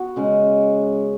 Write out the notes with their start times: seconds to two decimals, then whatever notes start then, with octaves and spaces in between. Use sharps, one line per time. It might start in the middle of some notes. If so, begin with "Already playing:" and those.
Already playing: B3 F#4
0.16 C#3 G#3 C#4